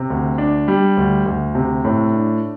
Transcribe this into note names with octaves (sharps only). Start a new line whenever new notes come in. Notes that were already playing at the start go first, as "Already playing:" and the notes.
Already playing: C3
D2
D4
G3
D2
D2
C3
A2
D4